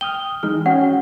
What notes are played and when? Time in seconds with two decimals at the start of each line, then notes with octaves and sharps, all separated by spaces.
0.01 G5 D#6 F6 G7
0.43 E3 G#3 D#4 F6
0.66 C#4 F#4 F#5 G5